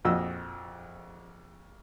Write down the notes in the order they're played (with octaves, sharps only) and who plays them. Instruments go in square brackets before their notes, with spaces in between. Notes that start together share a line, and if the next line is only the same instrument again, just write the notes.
[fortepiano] A#1 F2 F#4 D#5 E6